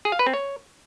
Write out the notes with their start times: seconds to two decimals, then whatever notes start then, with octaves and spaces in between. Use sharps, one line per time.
0.05 G#4
0.12 F5
0.19 B4
0.26 C4
0.34 C#5